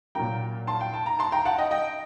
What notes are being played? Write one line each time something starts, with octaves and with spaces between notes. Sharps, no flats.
A#2 F#3 A#3 G5 A#5
A5 C6
G5
A5
A#5
A5 C6
G5 A#5
F#5 A5
D#5 G5
D#5 G5